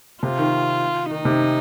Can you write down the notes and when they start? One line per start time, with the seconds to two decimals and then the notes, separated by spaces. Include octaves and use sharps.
0.23 C3 F4
0.38 D#3
1.11 D#3 D#4
1.25 C3